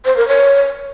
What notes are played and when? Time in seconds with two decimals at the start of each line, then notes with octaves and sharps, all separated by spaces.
0.05 C5
0.17 A#4
0.28 C#5